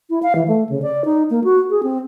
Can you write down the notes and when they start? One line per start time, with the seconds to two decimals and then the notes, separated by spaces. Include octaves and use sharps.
0.10 E4
0.23 F5
0.35 E3
0.48 A3
0.69 C#3
0.82 D5
1.05 D#4
1.30 A#3
1.44 F#4
1.70 G#4
1.83 C4